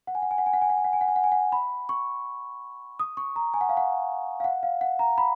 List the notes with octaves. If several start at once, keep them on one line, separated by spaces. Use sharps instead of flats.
F#5
G#5
F#5
G#5
F#5
G#5
F#5
G#5
F#5
G#5
F#5
G#5
F#5
G#5
F#5
G#5
F#5
B5
C#6
D#6
C#6
A#5
G#5
F#5
F5
F#5
F5
F#5
F5
F#5
A#5
B5